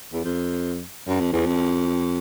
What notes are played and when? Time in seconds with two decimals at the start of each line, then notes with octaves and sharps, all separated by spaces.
0.13 E2
0.25 F2
1.08 F#2
1.20 F2
1.33 E2
1.46 F2